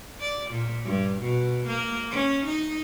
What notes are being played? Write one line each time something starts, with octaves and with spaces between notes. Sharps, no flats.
D5
A#2
G2
B2
A#3
C#4
D#4